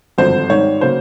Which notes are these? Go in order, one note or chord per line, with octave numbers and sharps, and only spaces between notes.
G#1 G2 D3 F3 C5
G#2 D#3 G3 C#5
C#3 F#3 A#3 C5